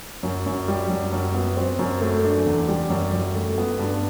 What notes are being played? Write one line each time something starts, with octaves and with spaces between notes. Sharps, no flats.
F#2
F#2
G3
F#2
F#2
B3
C4
F#2
A3
D4
E2
G3
F#2
F#2
A3
B3
G2